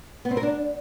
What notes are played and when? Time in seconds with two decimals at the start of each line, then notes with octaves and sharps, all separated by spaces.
0.25 B3
0.31 C4
0.37 A#4
0.43 D4